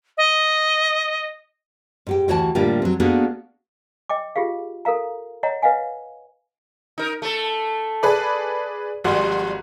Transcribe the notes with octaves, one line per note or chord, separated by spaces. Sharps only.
D#5
G#2 G4 G5
D2 E3 F#4 C#5 G5 A5
A2 D3 G3 A#3 F4 G4
F#3 C4
A#3 B3 D4 F#4 G#4 A4
D#5 G5 D6
F4 G4 G#4 F5
A4 A#4 F5 A#5
C#5 D#5 F#5 A#5
B4 D#5 F5 F#5 G#5
D#4 A#4
A3 A4
G#4 B4 D5
G#1 F3 G3 F#4 C6